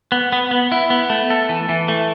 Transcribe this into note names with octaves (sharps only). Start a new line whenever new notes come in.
B3
B3
B3
E4
B3
A3
A4
E3
E3
A3